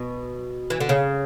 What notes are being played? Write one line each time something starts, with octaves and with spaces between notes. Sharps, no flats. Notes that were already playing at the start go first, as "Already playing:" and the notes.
Already playing: B2
E3
D3
C#3